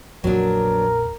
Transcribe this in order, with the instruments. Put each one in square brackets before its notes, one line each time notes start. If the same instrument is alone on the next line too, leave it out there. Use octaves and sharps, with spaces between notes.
[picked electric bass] A#1 F2 A#2 [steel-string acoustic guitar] F#3 B3 D4 [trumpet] A#4